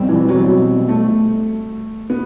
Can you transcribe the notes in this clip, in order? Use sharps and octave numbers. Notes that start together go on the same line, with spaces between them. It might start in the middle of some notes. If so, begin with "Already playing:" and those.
Already playing: B2 G3 C4
E3
F#3
A3
B3